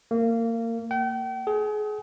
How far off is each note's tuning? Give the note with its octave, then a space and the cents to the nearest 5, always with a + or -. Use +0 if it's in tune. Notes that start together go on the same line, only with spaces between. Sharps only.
A#3 -25
G5 -40
G#4 +30